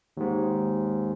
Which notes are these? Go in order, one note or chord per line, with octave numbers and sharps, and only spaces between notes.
D#2 G#2